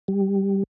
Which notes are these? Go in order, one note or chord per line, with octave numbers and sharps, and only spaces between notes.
G3